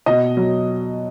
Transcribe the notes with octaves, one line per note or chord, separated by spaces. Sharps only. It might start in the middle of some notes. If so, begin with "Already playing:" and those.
B2 D#5
F#3